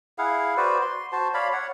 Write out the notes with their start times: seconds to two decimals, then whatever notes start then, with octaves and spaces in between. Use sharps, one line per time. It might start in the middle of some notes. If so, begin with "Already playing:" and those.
0.18 E4 G#4 F5 F#5
0.57 F#4 B4 C5 D5
0.82 C6
1.12 F#4 C5 A5
1.34 C#5 D5 F5 B5
1.53 C#5 F#5